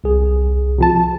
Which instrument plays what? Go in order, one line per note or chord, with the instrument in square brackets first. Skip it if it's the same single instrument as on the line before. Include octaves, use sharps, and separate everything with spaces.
[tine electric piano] C2 G#4
[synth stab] C3 F3 A5